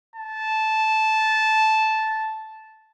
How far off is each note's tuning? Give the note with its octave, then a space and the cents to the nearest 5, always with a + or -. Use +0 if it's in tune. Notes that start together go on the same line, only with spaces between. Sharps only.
A5 -10